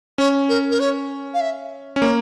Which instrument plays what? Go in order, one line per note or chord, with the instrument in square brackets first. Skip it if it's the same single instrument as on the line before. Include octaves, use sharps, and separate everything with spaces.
[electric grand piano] C#4 [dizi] C#5
[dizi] A#4
A#4
C#5
F5
E5
[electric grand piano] C#4
[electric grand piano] A#3 [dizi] C#5